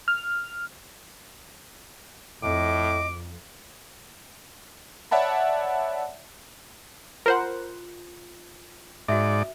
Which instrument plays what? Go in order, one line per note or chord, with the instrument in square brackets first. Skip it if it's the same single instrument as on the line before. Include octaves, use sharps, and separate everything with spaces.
[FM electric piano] F6
[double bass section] F2 [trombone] A2 [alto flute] D#5 [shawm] D6
[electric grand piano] C#5 D5 E5 F#5 A5 B5
[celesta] F4 [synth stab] A#4 C5 F#5
[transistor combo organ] G#2 D5 [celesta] F#4 E5